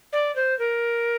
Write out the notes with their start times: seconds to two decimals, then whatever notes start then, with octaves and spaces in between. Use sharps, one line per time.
0.13 D5
0.36 C5
0.59 A#4